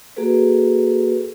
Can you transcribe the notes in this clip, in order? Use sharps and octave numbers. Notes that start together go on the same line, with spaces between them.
A#3 F#4 G#4 A4 B4